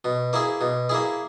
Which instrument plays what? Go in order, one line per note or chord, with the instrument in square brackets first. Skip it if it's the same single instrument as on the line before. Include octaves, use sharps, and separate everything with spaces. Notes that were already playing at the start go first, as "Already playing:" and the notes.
[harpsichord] B2
A#3 E4 G#4
B2
A#3 E4 G#4